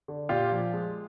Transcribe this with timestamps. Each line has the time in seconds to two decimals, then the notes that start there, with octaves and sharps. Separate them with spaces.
0.08 D3
0.29 A#2 F4 G4
0.52 F3
0.73 G#3